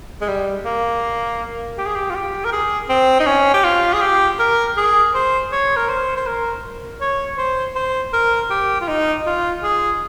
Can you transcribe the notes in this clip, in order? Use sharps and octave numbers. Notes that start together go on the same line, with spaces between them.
G#3
G3
A#3
G4
G#4
G4
F4
G4
A#4
G#4
C4
D#4
C#4
G4
F4
G#4
G4
A#4
G#4
C5
C#5
A#4
C5
C5
A#4
C#5
C5
C5
A#4
G4
F4
D#4
F4
G#4